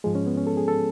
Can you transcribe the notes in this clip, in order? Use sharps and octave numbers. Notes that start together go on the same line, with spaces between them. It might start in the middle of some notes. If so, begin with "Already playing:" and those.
G#2 F3 G#3 G#4
C#4
B3
C#4
A4
G#4
A4